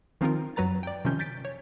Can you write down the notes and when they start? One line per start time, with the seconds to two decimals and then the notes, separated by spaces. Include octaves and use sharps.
0.21 D#3 F3 C4 D#4 F4 A#4
0.56 F#2 F#3 B4 A#5 A6
0.83 D5 G5
1.05 C3 D#3 F3 C#4 G6
1.19 G6 A6 B6 D7
1.45 C#5